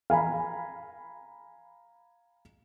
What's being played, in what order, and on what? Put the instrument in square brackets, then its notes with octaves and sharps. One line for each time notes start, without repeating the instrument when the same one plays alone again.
[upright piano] F5 G#5 A#5 B5